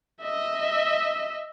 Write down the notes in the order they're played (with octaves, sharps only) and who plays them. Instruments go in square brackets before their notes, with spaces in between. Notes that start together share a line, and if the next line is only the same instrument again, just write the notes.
[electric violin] D#5 E5